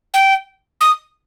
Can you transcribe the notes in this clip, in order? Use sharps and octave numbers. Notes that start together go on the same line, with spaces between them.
G5
D#6